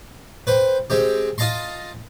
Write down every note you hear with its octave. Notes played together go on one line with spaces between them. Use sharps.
B4 C5 G5
G#3 C4 G4
F4 D#5 A5 A#5 C6